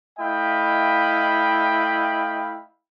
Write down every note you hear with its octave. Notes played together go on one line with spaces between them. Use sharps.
A3 E4 D#5 F5 G5 B5